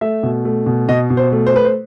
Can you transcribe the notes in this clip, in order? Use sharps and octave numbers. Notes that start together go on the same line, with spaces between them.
A3 E5
B2
A3
B2
B2 D#5
B2
C5
A3
C5
A3 B4
C5